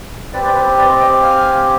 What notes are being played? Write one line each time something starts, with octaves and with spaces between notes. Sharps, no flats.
C4 G4 B4 D5
B4 D5
B4
B4 D5
C5 D#5
D#5 G5
F5 G#5